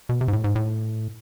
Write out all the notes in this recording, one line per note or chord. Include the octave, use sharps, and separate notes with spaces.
B2
C3
G#2
A2
G#2
A2